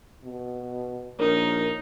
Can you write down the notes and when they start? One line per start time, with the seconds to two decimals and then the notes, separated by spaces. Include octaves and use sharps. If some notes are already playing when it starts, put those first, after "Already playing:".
0.24 B2
1.19 A#1 D#4 A#4 C#5